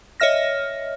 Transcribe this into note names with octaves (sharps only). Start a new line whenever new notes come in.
C#5 D#5 E5 F6 A#6